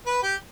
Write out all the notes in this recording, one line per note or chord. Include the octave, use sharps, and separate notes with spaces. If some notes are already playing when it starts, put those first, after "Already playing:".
B4
G4